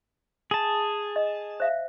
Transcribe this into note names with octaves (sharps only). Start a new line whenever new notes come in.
G#4 A5
D#5
C5 E5 F5